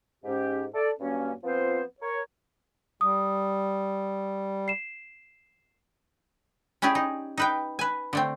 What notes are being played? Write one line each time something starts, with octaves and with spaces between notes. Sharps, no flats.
G#2 C#4 G4
A4 D5
G2 F#3 A#3 C#4
F3 B3 C4 F4 C5
A#4 C#5
G3 D#6
C7 E7
C#4 D4 E4 G4 G#4
D#4
D#4 B4 G5
B4 G#5
D3 A3 C4